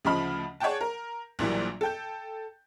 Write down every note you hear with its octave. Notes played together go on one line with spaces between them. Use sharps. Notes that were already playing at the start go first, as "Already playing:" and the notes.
D2 C#3 F3 D#5 B5 F6
G#4 C#5 D5 F#5 G5 A5
A#4
A#1 A#2 E3 F#3 G3
A4 G5 G6